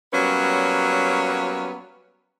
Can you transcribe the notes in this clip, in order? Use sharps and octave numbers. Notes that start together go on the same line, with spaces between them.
F#3 G3 A#3 B3 C#4